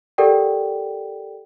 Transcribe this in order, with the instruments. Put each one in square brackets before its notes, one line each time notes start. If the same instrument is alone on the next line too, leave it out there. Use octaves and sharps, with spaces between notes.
[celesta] G4 A4 A#4 D5 F#5 G5